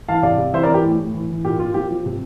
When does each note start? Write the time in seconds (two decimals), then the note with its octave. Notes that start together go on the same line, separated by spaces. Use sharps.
0.08 E3 F5 A5
0.23 C3 D5 F5
0.38 C3
0.53 E3 C5 E5
0.63 A#4 D5
0.68 E3
0.74 G4
0.84 A2
0.98 A2
1.14 E3
1.30 E3
1.44 A#2 G4
1.59 A#2 F4
1.74 F3 G4
1.91 F3
2.06 C3